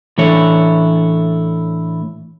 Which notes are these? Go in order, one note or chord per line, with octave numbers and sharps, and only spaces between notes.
A2 E3 D4 E4 A4 C#5